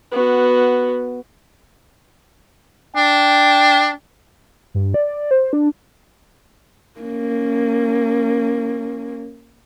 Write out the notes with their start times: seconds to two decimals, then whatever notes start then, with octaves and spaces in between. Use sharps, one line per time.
0.11 B3 F#4
2.96 D4 G5
4.74 G2
4.94 D5
5.31 C5
5.53 D4
7.00 A#3 C#4